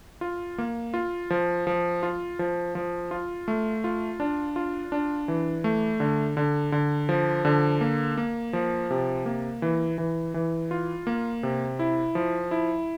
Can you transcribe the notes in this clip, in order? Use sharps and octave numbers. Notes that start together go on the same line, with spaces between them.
F4
A#3
F4
F3
F3
F4
F3
F3
F4
A3
F4
D4
F4
D4
E3
A3
D3
D3
D3
F3
D3
A#3
A#3
F3
C3
A#3
E3
E3
E3
F4
A#3
C3
E4
F3
E4